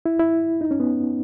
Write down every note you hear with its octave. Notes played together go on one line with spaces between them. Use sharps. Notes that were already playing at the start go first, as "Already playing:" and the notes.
E4
E4
D#4
C#4
B3